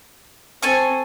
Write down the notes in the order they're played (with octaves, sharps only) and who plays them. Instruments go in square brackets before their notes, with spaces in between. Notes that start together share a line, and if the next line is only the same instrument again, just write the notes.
[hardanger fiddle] C4 [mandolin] A4 G#5 C#6